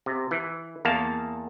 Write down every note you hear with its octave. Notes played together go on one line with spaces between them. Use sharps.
C3
E3
E2 A#3 F5 A5